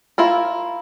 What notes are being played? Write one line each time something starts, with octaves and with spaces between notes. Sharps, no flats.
E4 F4 A#4